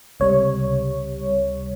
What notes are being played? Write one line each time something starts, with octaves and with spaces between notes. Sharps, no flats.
C#2 C3 G3 C#5